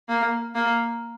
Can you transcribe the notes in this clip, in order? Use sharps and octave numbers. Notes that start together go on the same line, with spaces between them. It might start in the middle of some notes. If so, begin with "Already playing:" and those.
A#3
A#3